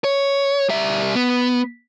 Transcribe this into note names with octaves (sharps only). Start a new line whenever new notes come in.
C#5
G3 E5
B3